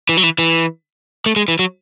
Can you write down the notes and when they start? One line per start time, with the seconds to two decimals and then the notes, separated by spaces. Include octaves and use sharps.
0.09 E3
0.17 F#3
0.23 E3
0.38 E3
1.26 A3
1.36 G#3
1.48 E3
1.59 F#3